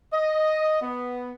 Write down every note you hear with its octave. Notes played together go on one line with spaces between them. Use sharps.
D#5
B3